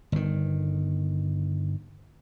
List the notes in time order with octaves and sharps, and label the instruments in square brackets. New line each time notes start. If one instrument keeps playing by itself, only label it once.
[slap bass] G1 D#3